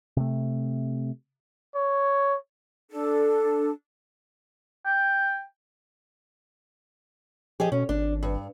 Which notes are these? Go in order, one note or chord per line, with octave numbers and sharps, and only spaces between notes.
C3 A3
C#5
D4 A4
G5
F3 G4 G#4 D#5
B2 C#4
G#1 D4
G2